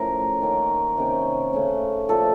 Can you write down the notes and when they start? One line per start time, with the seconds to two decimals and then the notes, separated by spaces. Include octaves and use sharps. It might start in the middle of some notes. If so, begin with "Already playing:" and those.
Already playing: A2 F3 A3 C#4 A#4
0.42 D#3 A#3 C#4
0.97 C3 D#3 A#3 C#4
1.53 C#3 A3 C#4
2.08 A#2 F3 A3 A4